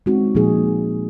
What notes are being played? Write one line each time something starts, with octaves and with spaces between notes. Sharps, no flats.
G#3 C4 D#4 F#4
A#2 F3 A#3 D#4 G#4